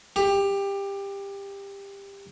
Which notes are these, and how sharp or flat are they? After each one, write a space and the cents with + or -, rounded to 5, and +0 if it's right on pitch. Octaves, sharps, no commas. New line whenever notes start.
G4 +20